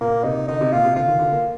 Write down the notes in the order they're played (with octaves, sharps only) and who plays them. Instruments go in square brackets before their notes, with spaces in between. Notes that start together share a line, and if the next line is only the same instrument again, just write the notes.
[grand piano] A#2 [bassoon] A#3
[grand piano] C3 [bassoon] D#4
[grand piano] D3 [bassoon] D#4
[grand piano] C3
[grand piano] A#2 [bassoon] F4
[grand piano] C3
[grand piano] D3 [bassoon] F4
[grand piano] D#3
D3
A#3